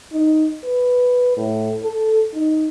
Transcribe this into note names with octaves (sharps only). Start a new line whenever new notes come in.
D#4
B4
A2
A4
D#4